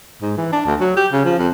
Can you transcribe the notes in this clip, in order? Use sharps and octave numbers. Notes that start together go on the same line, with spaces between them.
G#2
E3
D4
D2
F#3
G4
C#3
F3
F2